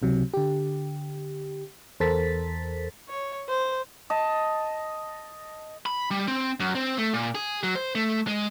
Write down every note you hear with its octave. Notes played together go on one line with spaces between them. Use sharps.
C#2 C3 F#3
D3 G4
E2 A4 A#4 C5 A6 B6
C#5
C5
D#5 A5
B5
G3
C4
F#2
C4
A3
A#2
G#4
F#3
C5
A3
G#3